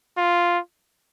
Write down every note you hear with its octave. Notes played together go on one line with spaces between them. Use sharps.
F4